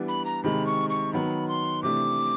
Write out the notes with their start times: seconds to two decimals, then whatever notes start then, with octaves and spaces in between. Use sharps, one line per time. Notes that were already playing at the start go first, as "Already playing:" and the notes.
Already playing: E3 G3 B3 D4
0.08 B5
0.25 A#5
0.44 C3 D#3 G#3 B5
0.66 C#6
0.90 C#6
1.13 D#3 F#3 B3 B5
1.48 C6
1.83 C3 E3 A3 D4 D6